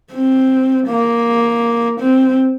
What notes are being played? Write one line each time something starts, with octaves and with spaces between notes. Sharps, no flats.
C4
A#3
C4